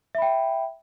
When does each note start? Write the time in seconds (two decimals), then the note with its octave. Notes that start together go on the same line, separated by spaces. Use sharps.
0.15 E5
0.18 B5
0.22 G5